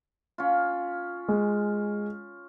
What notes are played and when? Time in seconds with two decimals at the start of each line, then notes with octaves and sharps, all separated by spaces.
0.38 C#4 F4
1.28 G#3